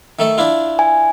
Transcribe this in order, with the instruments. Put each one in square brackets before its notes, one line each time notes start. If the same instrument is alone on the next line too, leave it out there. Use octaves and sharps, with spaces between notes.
[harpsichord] D#3 A3 A4
D4 E4 F4
[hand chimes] G#5